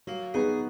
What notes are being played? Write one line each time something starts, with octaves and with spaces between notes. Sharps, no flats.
F#3 A#3
B3 D#4 F#4 G#4 B4